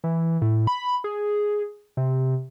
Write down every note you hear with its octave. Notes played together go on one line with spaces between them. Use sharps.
E3
A2
B5
G#4
C3